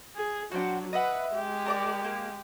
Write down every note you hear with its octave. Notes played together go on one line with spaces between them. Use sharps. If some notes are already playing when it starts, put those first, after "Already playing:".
G#4
F#3 D4 F#4 C5 G5
B4 D#5 E5 F#5
G#3 G4
A#4 D5 D6
A#3